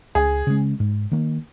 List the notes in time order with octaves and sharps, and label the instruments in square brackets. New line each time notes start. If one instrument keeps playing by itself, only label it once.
[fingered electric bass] C#2 [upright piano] G#4
[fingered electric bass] C#3 G#3 C#4
G#2
D#3 A#3